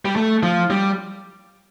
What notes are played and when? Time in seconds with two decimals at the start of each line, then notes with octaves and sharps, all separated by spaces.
0.05 G3
0.16 A3
0.43 F3
0.71 G3